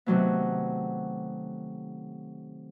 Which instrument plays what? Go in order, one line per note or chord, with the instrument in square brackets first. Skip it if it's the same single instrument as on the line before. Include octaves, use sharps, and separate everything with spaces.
[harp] C3 D#3 F#3 A3 B3